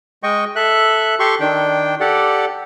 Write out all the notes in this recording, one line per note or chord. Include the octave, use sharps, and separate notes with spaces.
G#3 D#5 G5 C#6
A4 E5 F#6
G4 A4 C6 C#6
D#3 D4 G5
G4 A4 D5 F#5